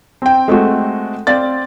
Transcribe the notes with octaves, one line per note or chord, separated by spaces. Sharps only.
C4 G5
G#3 A3 C4 F#4
C4 D5 F5 A6